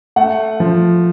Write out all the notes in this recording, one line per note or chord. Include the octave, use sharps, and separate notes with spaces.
A3 F#5
F3